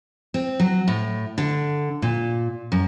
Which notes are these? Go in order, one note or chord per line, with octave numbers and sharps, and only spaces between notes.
C4
F#3
A2
D3
A#2
F#2